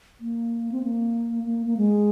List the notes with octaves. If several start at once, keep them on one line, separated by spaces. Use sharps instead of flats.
A#3
C4
A#3
A#3
A#3
G#3